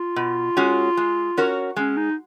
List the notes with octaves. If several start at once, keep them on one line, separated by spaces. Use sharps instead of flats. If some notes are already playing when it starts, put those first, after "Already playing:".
Already playing: F4
B2
G#3 C#4 F#4
G#3
C#4 F#4 A#4 C#5
G#3 C#4
D#4